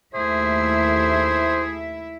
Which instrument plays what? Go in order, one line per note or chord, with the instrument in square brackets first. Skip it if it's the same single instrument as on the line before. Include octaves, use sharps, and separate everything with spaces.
[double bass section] D#2 A3 [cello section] E4 E5 [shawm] G#4 [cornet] C5